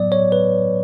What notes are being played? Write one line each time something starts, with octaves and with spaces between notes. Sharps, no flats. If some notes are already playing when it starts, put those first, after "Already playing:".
Already playing: A2 F#3 B3 D5
C#5
B4